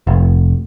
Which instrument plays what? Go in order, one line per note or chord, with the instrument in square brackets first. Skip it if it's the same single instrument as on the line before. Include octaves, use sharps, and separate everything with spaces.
[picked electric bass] F1